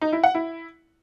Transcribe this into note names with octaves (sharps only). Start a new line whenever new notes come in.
D#4
E4
F#5
E4